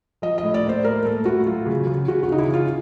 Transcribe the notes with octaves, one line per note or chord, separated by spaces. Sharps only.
F3 D#5
D#5
A2
D5
A#3 C5
A2 A#4
A2 A4
A2 F#4
F#3 F4
C#3
C#3
C#3 F#4
F#4
C#3 D#4
E4
C#3
F4